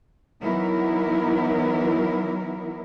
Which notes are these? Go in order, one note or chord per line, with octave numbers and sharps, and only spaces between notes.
E3 F#3 B3 D#4 E4 A#4